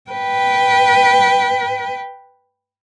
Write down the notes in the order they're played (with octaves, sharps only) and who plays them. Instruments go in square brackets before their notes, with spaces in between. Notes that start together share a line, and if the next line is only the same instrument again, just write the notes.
[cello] B4 G5